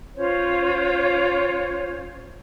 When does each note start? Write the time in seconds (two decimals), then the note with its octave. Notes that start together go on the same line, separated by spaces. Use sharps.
0.15 C#4 F4 C5 C#5